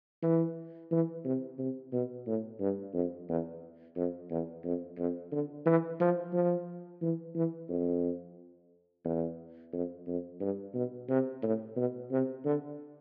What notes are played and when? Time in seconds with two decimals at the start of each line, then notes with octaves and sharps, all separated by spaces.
0.23 E3
0.91 E3
1.25 C3
1.59 C3
1.93 B2
2.27 A2
2.60 G2
2.94 F2
3.29 E2
3.96 F2
4.31 E2
4.64 F2
4.98 F2
5.32 D3
5.66 E3
6.00 F3
6.33 F3
7.02 E3
7.35 E3
7.69 F2
9.05 E2
9.73 F2
10.07 F2
10.41 G2
10.74 B2
11.09 C3
11.43 A2
11.77 B2
12.11 C3
12.45 D3